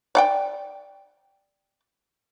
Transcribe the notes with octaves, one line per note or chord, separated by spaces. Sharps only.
D5 F#5 G5